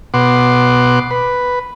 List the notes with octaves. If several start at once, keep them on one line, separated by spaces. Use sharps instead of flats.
B2 F#5 C6 D6
B4